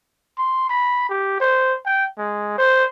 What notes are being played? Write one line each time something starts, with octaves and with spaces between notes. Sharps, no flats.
C6
B5
G4
C5
G5
G#3
C5